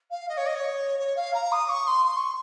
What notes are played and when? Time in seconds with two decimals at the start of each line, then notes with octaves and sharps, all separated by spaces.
0.11 F5
0.29 D#5
0.38 C#5
0.46 D#5
0.55 C#5
0.99 C#5
1.17 F5
1.34 A#5
1.52 D#6
1.69 C#6
1.87 C6
2.05 C6
2.17 C#6